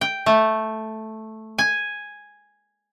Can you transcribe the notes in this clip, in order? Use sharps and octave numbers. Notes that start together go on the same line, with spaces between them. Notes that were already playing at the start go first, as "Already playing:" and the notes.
G5
A3
G#5